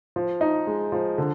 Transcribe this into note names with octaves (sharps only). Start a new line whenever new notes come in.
F3
D#4
G#3
F3
D3